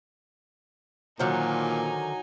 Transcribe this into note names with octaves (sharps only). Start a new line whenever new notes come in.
A#2 D3 D#3 F#3 D#4 C5 G#5